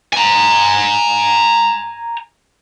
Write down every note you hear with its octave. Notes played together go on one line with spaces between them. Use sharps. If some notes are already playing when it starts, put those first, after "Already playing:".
G#5 A#5